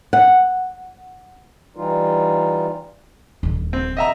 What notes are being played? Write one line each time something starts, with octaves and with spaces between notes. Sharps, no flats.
F#5
E3 G3 D#4 F4
D#1 D#3
C4
D#5 E5 A#5